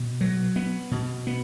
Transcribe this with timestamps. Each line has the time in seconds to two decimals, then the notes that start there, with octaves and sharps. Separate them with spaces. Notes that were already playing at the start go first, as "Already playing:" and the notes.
Already playing: B2
0.21 F#3
0.56 B3
0.91 B2
1.27 B3